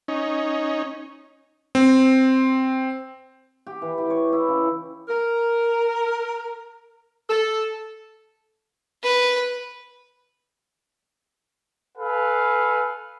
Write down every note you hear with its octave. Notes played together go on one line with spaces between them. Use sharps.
C#4 D#4
C4
G4
E3
G4
C#5
E4
C#3
A#4
A4
B4
A4 B4 F5 G#5